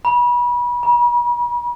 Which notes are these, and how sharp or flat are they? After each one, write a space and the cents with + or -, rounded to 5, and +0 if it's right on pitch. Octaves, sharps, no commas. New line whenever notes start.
B5 -30
B5 -45